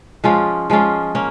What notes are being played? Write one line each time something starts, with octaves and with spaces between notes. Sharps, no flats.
F3 G#3 C#4 F4
F3 G#3 C#4 F4
A#3 C#4